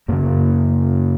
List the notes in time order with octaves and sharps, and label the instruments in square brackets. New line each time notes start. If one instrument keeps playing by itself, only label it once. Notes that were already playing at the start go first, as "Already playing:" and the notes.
[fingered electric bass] F#2 C#3 A#3